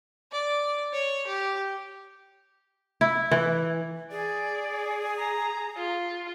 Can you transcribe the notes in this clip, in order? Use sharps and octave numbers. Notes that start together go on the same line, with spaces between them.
D5
C#5
G4
E4
E3
G#4 D5
A#5
F4